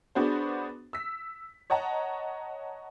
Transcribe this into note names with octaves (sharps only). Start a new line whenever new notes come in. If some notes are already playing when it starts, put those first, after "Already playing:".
B3 D4 F#4 G#4 C5
E6 B6
C#5 D#5 F#5 A5 A#5